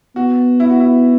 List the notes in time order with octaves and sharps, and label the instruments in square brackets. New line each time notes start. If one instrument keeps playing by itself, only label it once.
[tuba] B3 [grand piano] F#4
[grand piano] E4
F#4
E4